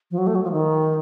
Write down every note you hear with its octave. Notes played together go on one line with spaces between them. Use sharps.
F3
F#3
A3
F#3
F3
D#3